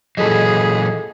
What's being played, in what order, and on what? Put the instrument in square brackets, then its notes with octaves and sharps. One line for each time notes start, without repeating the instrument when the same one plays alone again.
[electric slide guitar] A#2 E3 F#3 [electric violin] G#4 [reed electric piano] A4 D#5